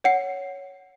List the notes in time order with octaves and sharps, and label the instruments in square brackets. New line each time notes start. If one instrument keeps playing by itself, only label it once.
[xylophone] C#5 F#5 C7